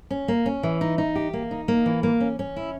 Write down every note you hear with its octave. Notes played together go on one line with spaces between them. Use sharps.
C#4
A#3
C#4
E3
D#4
D#4
G4
A#3
D#4
A#3
E3
A#3
C#4
C#4
E4